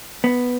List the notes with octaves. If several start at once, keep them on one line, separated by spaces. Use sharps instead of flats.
B3